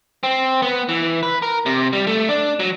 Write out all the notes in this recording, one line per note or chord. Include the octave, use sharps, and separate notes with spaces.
C4
B3
E3
B4
A#4
C3
G3
A3
D4
F#3